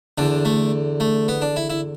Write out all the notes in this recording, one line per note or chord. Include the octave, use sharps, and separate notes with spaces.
E2 D3 D4
A3
A3
B3
D4
E4
E4